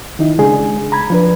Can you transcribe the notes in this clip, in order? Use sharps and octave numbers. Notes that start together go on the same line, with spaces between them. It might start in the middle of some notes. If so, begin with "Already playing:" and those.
D#3 D#4 E4
C#3 G#3 D4 G#4
A#5 B5 G#6
F3 D4 B4